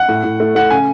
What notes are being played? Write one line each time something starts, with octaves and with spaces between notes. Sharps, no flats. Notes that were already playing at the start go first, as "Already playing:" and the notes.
Already playing: F#5
A2
A2
A3
A3 F#5
C#3 G#5